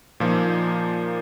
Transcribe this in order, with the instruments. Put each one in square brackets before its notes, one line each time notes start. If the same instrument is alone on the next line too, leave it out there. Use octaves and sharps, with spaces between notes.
[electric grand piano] A#2 F3 A#3 D#4